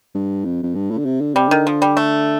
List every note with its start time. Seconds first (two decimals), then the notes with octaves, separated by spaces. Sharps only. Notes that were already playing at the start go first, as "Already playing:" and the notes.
0.14 G2
0.45 F2
0.63 F2
0.75 G2
0.91 A2
0.98 D3
1.05 C3
1.21 D3
1.35 C3 G3
1.49 D3 D#3
1.67 F3
1.82 G3
1.97 A3